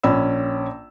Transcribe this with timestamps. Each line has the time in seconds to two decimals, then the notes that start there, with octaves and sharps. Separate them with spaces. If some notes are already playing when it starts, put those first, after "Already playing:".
0.03 A#1 C#4 B5 E6